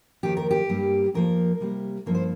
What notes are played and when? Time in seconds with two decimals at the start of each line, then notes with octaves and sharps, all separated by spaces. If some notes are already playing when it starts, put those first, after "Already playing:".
0.23 F2 D#3 A#3 G4
0.37 A#4
0.50 G4
0.69 G2 G3 A#3
1.14 F2 F3 A#3 A#4
1.60 C3 G3 A#3
2.06 G2 F3 A#3 A#4
2.15 C5